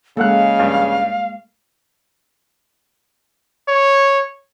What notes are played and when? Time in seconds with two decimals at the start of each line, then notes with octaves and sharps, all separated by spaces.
0.17 C#3 G#3 A#3 A4 F5 F#5 F#6
0.59 G2
3.69 C#5